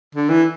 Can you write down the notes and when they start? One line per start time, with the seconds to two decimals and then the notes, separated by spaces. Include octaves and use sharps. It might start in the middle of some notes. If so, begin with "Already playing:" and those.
0.15 D3
0.30 E3